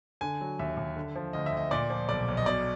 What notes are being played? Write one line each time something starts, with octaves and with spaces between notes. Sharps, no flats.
D3 G#5
F#3
D#2 E5
D#2
D3
F3
D2 D#5
E5
D2 D#5
A#2 D5
F3
B1 D5
B1
D#5
B2 D5